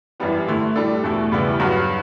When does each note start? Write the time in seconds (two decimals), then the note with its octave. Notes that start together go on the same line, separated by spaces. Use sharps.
0.20 F#2 E3 G3 B3
0.47 D3 A3 E4
0.76 A2 G3 D4 A4
1.04 E2 B2 A3 E4
1.32 E2 C#3 G3 B3 E4
1.60 G2 F#3 B3 F#4